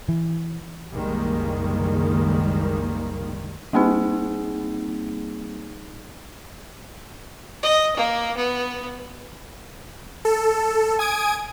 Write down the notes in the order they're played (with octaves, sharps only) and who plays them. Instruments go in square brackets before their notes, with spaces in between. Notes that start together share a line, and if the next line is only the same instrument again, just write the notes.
[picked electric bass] E3
[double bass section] F#1 C2 D#3 G3 G#3 A#3
[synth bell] G3 A#3 C4 D#4 G#4
[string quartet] D#5
A#3
B3
[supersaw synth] A4
G#5 D#6 G#6 D7